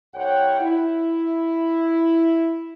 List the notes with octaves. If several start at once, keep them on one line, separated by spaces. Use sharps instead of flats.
C2 C#5 F#5 G5
E4